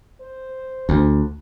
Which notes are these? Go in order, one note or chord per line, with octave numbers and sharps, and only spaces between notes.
C5
D2